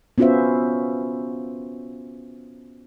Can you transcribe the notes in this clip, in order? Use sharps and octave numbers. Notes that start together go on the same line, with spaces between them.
B3 C#4 F4 F#4 C5 E5